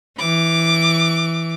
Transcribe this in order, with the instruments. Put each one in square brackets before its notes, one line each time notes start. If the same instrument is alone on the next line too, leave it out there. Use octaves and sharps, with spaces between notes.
[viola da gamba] E3 [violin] D6